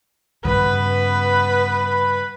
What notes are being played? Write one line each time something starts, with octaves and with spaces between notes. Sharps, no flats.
G2 C#3 B3 B4